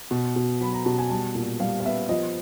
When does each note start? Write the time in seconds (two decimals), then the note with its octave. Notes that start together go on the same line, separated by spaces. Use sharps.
0.11 B2
0.36 B2
0.61 F#3 B5
0.73 A#5
0.85 B2 A5
0.98 G#5
1.10 G3 A5
1.35 A#2
1.60 G3 F5
1.80 F5
1.85 B3 E5
2.09 F3 D#5